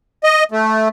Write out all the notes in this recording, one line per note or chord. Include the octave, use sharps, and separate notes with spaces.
D#5
A3